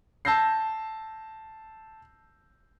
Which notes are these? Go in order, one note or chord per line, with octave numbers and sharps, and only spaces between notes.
A5 E6 G6 A#6 C7